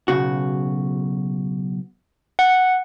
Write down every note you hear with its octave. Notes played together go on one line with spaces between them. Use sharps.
B1 C#3 F#4
F#5